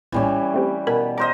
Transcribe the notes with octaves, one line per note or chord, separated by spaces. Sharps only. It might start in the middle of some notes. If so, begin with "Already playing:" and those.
A#1 E2 A2 E3 G3 C#4
A3 C4 G4
B2 A#4 G#5 B5
A#4 C5 D#5 D6